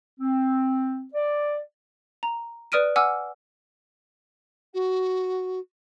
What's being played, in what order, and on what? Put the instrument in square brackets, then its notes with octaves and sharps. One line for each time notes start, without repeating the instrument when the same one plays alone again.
[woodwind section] C4
D5
[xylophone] A#5
B4 D5 D#6 F6 D7 D#7
F#5 G#5 D6 E6 F6
[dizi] F#4